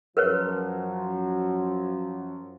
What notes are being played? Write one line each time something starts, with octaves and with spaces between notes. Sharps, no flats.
F#2 F3 F#3 A#4 B4 C#5